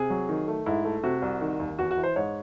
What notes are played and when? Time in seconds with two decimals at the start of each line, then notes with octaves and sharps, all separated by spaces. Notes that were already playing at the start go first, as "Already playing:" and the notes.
Already playing: C3 G#4
0.10 F#3
0.29 D#3
0.48 A3
0.66 G#2 E4
0.85 A3
1.03 C3 F#4
1.22 C2
1.41 D#3
1.60 D#2
1.79 E2 F#4
1.91 F#4
1.97 E3
2.03 C5
2.16 G#2 C#5